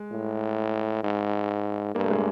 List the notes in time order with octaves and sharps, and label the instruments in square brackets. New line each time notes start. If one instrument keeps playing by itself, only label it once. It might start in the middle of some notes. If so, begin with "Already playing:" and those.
Already playing: [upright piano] G#3
[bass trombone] A2
G#2
[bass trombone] G2 [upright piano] A#3
[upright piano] A3
G#3